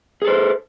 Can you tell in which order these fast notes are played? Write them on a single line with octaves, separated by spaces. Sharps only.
G#4 A4 C5